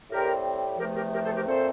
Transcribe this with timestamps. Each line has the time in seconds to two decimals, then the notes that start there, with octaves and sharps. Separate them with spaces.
0.10 A2 G3 C4 G4 A#4
0.79 E2 C3 F3 A3 G4 A#4
0.95 G4 A#4
1.12 G4 A#4
1.24 A4 C5
1.35 G4 A#4
1.46 A#2 A3 C4 A4 C5